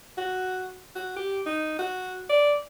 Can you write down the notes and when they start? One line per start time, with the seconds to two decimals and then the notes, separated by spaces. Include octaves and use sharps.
0.18 F#4
0.96 F#4
1.16 G4
1.46 D#4
1.79 F#4
2.30 D5